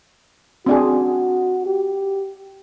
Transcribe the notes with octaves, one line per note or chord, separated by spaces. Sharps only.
C4 D4 F#4 G#4
G4